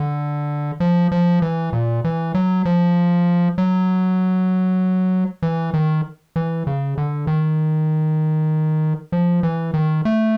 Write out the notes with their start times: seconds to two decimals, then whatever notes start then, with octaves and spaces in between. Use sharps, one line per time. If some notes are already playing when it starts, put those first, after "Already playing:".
Already playing: D3
0.80 F3
1.12 F3
1.42 E3
1.73 A#2
2.04 E3
2.35 F#3
2.65 F3
3.58 F#3
5.43 E3
5.74 D#3
6.36 E3
6.67 C#3
6.98 D3
7.27 D#3
9.12 F3
9.43 E3
9.74 D#3
10.05 A3